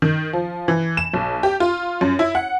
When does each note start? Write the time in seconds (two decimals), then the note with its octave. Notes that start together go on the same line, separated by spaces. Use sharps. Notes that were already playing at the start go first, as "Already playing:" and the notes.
0.02 D#3
0.33 F3
0.68 E3
0.97 E7
1.13 B1
1.43 G4
1.60 F4
2.01 F#2
2.19 E4
2.35 F#5